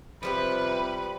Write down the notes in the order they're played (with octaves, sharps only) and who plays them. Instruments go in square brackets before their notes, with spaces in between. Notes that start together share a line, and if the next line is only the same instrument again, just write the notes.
[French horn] C3 [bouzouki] F3 G3 B3 [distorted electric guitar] B4 [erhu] B5